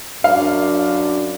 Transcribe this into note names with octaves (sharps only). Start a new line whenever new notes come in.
F#2 D4 F5